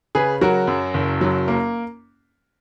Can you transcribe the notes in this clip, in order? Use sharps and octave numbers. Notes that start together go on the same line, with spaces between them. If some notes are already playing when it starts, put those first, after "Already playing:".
C#3 G#4 B4
F#3 F#4 A#4
F#2
F#1
F#3
A#3